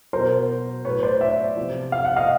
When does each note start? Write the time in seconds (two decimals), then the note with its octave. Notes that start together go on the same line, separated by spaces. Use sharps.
0.13 B2 F#3 A#4 C5
0.85 A2 F#3 B4 C#5
1.03 C5 D5
1.21 D5 E5
1.57 C3 F3
1.92 F5
2.05 F#5
2.16 D#5 F5